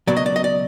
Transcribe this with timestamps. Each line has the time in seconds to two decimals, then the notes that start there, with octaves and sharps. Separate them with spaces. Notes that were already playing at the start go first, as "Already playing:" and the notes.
0.07 C#2 B2 F#3 D5
0.17 D#5
0.26 D5
0.36 D#5
0.44 D5